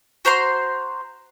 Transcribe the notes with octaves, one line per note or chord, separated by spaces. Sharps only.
F#4 C5 A#5 C6